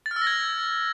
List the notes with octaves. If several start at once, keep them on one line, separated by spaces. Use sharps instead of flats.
A6
F6
E6
A#6
G#6